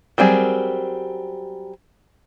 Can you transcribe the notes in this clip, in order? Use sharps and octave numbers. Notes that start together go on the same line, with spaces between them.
F#3 G3 C4 G#4 A#4